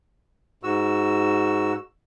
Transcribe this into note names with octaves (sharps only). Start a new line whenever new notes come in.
G#2 F#4 E6